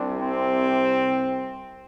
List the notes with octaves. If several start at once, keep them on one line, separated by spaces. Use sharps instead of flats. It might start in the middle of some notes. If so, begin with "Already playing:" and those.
Already playing: C2 C3 D4
C4